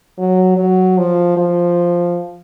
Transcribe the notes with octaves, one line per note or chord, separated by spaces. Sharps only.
F#3
F#3
F3
F3